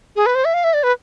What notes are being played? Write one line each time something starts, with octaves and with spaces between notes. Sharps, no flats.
G#4
B4
C5
E5
F5
E5
D5
B4